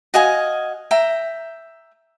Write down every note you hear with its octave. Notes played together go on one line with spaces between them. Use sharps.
F#4 D#5 F5 G#5
E5 G5 A#5